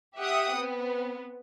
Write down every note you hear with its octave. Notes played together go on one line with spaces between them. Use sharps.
G4 E5 F#5 G5 D#6
B3 C4